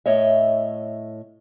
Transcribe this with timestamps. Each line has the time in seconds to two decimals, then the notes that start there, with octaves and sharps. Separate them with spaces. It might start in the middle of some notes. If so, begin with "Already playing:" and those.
0.06 A2 C#5 D#5 E5